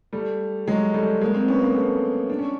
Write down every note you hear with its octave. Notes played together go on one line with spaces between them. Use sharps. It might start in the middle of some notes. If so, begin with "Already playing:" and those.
G3 A3
F#3 G#3
G3 A3
G#3 A#3
A#3 C4
B3 C#4
A#3 C4
A3 B3
D4
C#4